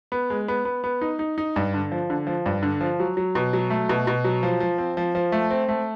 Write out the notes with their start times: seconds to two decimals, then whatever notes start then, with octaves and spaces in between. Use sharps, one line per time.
0.12 B3
0.30 G#3
0.48 B3
0.65 B3
0.84 B3
1.01 D#4
1.19 D#4
1.38 D#4
1.56 G2
1.74 D3
1.92 F3
2.10 D3
2.27 F3
2.46 G2
2.63 D3
2.81 F3
3.00 F#3
3.17 F#3
3.35 B2
3.53 F#3
3.70 A3
3.89 B2
4.07 B2
4.24 F#3
4.43 F3
4.60 F3
4.78 C4
4.97 F3
5.15 F3
5.32 A3
5.50 C4
5.68 A3